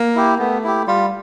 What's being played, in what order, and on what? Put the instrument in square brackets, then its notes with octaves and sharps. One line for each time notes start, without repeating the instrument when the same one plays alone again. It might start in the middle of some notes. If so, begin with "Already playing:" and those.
Already playing: [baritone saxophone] A#3
[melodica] E4 G4
[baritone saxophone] A3 [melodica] B3
[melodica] E4 G4
[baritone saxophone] G3 [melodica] F4